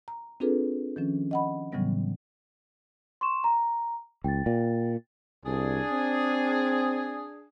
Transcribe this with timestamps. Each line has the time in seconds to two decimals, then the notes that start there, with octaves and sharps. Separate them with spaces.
0.08 A#5
0.40 C4 D4 F4 G#4 A4 B4
0.96 D#3 F3 C#4
1.31 D#5 F#5 B5
1.72 A2 C#3 E3 F#3 G3 B3
3.21 C6 C#6 E7
3.44 A#5
4.24 C#2 G5 A6
4.46 A#2
5.45 C2 D4 G#4
5.92 C4